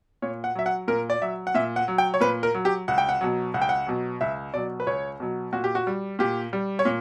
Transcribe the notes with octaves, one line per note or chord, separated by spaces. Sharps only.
A#2 C#5
F#5
F#3 E5
F#5
A#2 A#4
D5
F#3 E5
F#5
A#2 E5
F#5
F#3
G5
C#5
A#2 B4
A#4
F#3
G4
C#2 F#5
G5
F#5
B2 F#3
C#2 F#5
G5
F#5
B2 F#3
C#2 E5
B2 F#3 D5
B4
C#2 C#5
B2 F#3
A#2 F#4
G4
F#4
G3
A#2 G4
G3
C#5
A#2